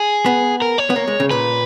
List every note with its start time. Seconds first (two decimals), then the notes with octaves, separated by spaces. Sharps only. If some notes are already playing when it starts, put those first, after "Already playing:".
Already playing: G#4
0.26 B3
0.62 A#4
0.78 C#5
0.90 B3
0.96 A#3
1.08 G#3
1.20 C#3
1.31 A#2 B4